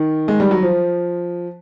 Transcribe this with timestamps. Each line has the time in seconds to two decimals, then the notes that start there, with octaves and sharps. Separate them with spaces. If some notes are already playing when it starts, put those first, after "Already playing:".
Already playing: D#3
0.28 G#3
0.40 G3
0.51 F#3
0.62 F3